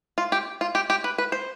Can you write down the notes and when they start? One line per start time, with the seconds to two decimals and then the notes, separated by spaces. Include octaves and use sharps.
0.18 F4
0.32 G4
0.61 F4
0.75 G4
0.90 G4
1.04 B4
1.18 B4
1.32 C5